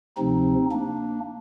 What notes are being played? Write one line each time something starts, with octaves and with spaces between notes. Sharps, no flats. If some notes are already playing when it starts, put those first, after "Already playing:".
D2 C3 F3 C4 D#4
A#3 D4